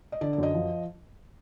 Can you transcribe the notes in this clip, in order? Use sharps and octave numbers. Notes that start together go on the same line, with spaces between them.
D#5
D3 D5
D5
F#2 D#5
F3